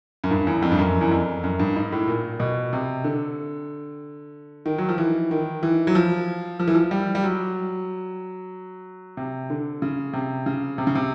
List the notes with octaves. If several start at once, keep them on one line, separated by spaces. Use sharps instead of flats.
F#2
G2
E2
F2
G2
F#2
E2
F2
F#2
G2
G#2
A2
A#2
B2
C3
D3
D#3
F#3
F3
E3
D#3
E3
F#3
F3
F3
E3
F3
G3
G3
F#3
C3
D3
C#3
C3
C#3
C3
C#3
C3